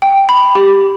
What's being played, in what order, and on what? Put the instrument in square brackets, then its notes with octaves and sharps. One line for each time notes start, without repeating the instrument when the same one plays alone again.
[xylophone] G5
B5
G4